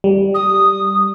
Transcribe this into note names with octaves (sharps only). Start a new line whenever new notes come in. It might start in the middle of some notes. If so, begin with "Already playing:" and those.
G3
D#6